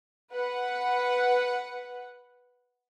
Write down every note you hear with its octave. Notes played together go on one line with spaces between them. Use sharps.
B4 F#5